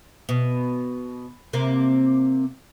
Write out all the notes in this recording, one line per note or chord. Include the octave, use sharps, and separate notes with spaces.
B2
C3 A#3